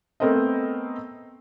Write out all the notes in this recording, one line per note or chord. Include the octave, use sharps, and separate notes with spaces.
A3 B3 C4 A#4 C5 D#5